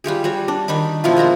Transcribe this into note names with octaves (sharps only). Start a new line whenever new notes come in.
G3 F4 G4 G#4
G3 F#4 C#5
D4
D#3 D4 D#4 B5
B2 F3 E4 F4
G#3 A#3 A#5 C6